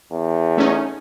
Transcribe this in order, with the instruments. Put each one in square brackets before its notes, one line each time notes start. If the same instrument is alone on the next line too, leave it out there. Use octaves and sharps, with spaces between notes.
[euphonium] E2
[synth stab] A3 C#4 D#4